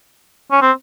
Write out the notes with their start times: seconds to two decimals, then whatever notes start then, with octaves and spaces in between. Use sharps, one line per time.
0.51 C#4
0.62 C4